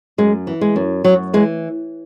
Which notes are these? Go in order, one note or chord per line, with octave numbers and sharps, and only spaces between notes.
F#2 G#3
E3
G#3
F#2
F#2 F#3
E3 G#3